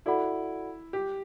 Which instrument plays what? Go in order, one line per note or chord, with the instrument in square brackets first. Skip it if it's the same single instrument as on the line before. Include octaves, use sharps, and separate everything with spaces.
[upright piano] E4 [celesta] F#4 A4 D5 F#5 B5
[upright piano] G4